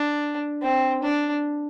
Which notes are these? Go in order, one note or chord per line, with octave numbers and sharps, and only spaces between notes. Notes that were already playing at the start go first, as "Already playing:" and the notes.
Already playing: D4
C4
D4